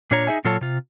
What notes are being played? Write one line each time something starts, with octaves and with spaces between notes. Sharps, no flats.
A#2 D4 F4 C#5 A#5
D#4 G#4 E5 G#5
A#2 F#3 F4 A4 C#5 A5
C3 F4